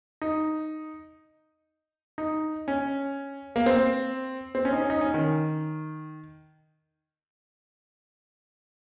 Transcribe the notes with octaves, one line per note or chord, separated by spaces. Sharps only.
D#4
D#4
C#4
A#3
C4
C4
C#4
D#4
C#4
D#4
C#4
D#3